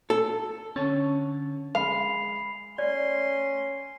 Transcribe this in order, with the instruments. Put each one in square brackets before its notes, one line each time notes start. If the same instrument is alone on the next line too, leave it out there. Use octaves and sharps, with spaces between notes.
[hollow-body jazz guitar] A4
[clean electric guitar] D3 C#5 A5 [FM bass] C#4
[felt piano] G#3 [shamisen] F5 [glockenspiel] B5 C7 F7
[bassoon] C#4 [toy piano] D5 [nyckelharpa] C6